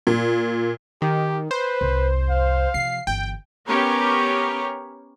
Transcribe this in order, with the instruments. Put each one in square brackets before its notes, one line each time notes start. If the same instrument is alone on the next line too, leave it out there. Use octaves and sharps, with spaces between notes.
[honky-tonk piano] A#2
[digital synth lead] D#3 [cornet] G4
[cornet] B4 [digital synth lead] C5
[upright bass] C2 F2
[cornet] F5
[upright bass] C3 F3 [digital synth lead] C7
[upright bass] G1 E3 [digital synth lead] G5
[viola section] B3 C#4 G4 A#4 C#5